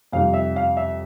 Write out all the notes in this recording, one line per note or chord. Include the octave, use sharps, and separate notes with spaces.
F2 C3 D#3 G3 F5
E5
F5
E5